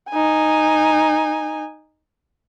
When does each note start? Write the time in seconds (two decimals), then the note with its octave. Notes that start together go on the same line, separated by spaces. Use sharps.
0.10 D#4 G#5